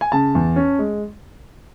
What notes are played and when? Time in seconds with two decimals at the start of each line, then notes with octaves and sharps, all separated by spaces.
0.01 G#5
0.12 C#3 A5
0.35 E2
0.56 C#4
0.79 G#3